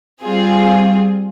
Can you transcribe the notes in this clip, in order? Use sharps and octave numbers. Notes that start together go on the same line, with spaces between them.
G3 C4 F4 G#4